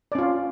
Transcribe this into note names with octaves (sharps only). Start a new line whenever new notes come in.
C#4 F4 D5